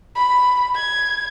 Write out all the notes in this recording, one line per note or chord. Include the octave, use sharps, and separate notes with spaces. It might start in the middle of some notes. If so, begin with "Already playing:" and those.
B5
G#6